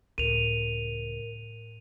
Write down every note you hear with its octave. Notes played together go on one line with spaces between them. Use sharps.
C#2 A2 A#4 D#7 F7